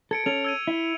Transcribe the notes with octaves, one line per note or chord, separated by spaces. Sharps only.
A4 G#6 C#7 D7
C#4 A4 F7
E6 G#6 D#7
E4